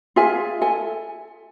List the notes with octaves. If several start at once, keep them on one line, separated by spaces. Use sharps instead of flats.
F4 G#4 E5 G#5
A4 G#5